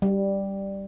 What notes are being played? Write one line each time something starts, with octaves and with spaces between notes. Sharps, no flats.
G3